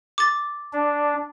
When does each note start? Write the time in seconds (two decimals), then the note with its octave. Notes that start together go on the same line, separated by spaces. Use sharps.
0.18 D6 A6
0.73 D4